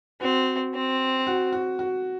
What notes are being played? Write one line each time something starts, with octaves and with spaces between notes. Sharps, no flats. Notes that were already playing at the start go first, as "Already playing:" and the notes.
C4 F#4
C4
F#4
F#4
F#4